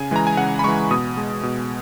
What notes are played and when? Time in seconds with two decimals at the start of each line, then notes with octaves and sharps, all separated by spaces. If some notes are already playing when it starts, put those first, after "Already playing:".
Already playing: C#3 G#5
0.11 E3 G#3 A#5
0.27 G#5
0.37 C#3 F#5
0.59 B5
0.64 E3 G#3 C#6
0.91 B2 D#6
1.17 G#3
1.43 B2